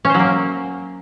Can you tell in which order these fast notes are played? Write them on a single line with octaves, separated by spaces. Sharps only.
C#4 C5 F#3 A#3